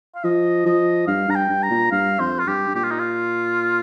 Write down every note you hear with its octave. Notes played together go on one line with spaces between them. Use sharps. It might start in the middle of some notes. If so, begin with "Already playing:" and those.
F5
F3 D#5
F3 D#5
G2 F5
G2 A#5
G5
G2
A#5
A#2
G2 F5
F2 C5
F4
G2 G4
G2
A#2 G4
F4
D#4
F4